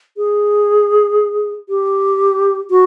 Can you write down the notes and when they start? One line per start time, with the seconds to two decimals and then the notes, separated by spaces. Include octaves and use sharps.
0.17 G#4
1.69 G4
2.70 F#4